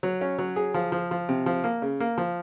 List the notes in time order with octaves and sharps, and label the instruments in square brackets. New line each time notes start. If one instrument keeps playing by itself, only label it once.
[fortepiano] F#3
C#4
F#3
G#4
F3
F3
F3
C3
F3
A#3
C#3
A#3
F3